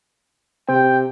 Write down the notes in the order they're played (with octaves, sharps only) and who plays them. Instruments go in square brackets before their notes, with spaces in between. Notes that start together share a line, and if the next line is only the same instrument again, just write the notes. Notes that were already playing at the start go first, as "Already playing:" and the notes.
[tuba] C3 [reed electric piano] C4 [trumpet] G5